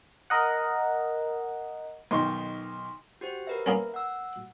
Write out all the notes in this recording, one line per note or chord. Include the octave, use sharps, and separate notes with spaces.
A#4 D#5 F#5
B1 D#3 C6 C#6
F#4 G4 C5
A#4 B4 E5
A#3 B3 C#4
F#5 E6